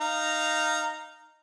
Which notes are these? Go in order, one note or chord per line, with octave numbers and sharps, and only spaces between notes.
D#4 F5 A#5